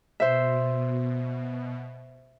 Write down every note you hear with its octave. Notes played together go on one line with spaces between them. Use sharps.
B2 C5 E5